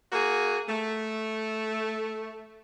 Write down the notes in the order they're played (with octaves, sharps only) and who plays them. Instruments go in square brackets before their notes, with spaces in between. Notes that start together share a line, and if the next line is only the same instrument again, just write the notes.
[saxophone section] A#3 F#4 G#4
A3